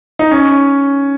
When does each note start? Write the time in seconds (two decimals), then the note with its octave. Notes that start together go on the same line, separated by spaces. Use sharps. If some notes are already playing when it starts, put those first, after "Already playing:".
0.19 D#4
0.31 C#4